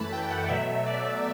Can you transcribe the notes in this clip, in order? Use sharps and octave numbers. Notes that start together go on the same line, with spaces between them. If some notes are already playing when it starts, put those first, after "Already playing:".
Already playing: F#2 E3 A3 A5 B5
G5
F#5
D5
B2 F#3 A3 E5
D5